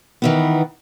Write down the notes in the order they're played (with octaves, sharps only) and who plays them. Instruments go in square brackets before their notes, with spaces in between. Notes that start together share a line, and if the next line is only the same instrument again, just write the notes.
[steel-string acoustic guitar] D#3 E3 B3